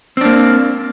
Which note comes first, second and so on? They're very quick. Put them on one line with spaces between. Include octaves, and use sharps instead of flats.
C4 D4 A#3